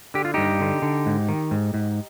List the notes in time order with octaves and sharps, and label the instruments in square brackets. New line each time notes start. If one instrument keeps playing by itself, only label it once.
[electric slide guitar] D3 G4
F4
G2 D#4 G4
D3
D3
G#2
D#3
G#2
G#2